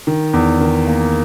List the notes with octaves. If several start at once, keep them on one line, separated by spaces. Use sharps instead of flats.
D#3
E2
D#3
A#3